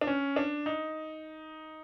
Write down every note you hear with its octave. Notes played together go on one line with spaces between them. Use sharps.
D4
C#4
D4
D#4